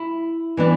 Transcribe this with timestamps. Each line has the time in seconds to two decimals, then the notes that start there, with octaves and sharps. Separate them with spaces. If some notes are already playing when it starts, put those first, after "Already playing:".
Already playing: E4
0.57 E3 B3 D4